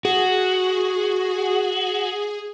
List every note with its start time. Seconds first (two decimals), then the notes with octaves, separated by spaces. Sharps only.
0.05 F#4 G#4